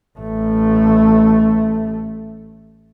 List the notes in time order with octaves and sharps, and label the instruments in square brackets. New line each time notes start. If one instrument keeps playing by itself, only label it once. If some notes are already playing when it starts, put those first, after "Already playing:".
[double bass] A1 A3